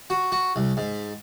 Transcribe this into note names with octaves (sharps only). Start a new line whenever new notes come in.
F#4
F#4
C2
G#2